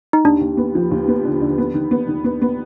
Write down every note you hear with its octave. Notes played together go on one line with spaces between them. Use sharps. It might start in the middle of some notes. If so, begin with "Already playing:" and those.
D#4
D#2 D4
D#2
B3
F3
D#2
B3
D3
D3
B3
D#3
B3
D#3
B3
B3